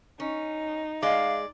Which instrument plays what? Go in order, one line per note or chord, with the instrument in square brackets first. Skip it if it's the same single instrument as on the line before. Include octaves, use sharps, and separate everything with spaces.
[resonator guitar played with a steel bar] C#4 [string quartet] D#4
[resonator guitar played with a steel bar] G#3 [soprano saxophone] D5 [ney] F5